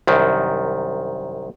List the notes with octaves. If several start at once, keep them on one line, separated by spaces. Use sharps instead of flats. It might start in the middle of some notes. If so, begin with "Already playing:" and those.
C2 F#2 D#3